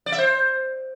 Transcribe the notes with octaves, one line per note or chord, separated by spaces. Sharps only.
D5
E5
C5